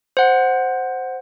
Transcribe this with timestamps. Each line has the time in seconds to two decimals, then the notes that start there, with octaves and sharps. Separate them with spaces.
0.17 C5 F#5